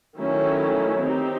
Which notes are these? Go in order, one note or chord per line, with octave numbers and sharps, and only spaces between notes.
D#3 F#3 A3 C#4 E4
C4 D#4 G4